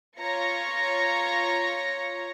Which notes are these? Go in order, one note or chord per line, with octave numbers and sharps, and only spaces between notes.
F4 C#5 A#5 A#6 C#7